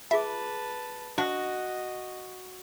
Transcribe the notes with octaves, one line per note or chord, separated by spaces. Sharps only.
F4 G#4 B4 E5 A5 D6
D4 F#4 D#5